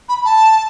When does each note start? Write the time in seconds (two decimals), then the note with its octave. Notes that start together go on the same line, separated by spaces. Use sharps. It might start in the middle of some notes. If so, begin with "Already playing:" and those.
0.09 B5
0.25 A5